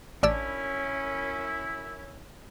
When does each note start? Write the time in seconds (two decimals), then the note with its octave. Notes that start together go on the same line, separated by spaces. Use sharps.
0.23 A1 F#2 C#4 D4 E4 D5 E6